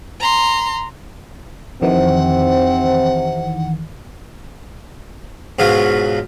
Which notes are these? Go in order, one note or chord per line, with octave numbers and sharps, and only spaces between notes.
A#5 C6
F2 C3 D#3 E3 C4 F#5
G#2 B2 F#3 F4